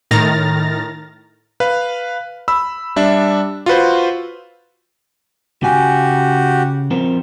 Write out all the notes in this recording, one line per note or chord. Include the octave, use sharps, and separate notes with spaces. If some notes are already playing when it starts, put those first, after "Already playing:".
A2 D#3 A#5 F6 A6 A#6
B4 F5
B5 E6
G3 D4 E5
F4 F#4 B4 C5
C#3 F#4 G4 G#5
F3 C4 A#4